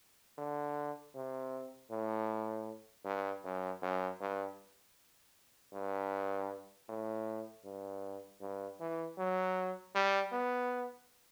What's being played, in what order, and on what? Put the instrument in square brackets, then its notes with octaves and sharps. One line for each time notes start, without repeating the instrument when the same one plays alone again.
[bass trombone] D3
C3
A2
G2
F#2
F#2
G2
G2
A2
G2
G2
E3
F#3
G3
B3